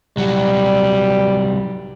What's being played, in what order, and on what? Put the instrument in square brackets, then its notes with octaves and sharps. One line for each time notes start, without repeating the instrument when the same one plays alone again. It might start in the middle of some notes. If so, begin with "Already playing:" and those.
[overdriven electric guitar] C2 F#3 [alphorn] G3